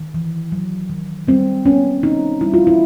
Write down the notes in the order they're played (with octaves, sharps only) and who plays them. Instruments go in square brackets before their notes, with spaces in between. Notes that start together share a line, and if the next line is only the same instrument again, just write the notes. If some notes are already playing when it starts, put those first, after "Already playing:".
Already playing: [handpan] D#3
E3
F#3
D#3
G3 C4
B3 C#4
C4 D#4
G3 E4
F4
E4